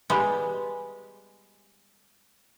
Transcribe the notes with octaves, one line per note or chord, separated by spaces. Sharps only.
G3 G#3 B3 G4